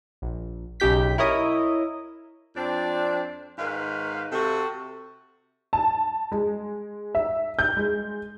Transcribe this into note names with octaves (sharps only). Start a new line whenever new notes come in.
A#1
B1 C#3 D#4 G4 G6 B6
E4 A#4 C#5 D#5 D#6
F2 C4 D4 D5
G#2 D#3 B4 F5
C3 F#4 A4
A5
G#3
E5
G6
G#3